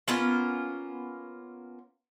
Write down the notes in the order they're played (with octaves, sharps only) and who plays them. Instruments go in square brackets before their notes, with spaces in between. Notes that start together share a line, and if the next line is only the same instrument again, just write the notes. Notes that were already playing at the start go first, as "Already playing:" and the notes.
[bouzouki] A#3 B3 C#4 F4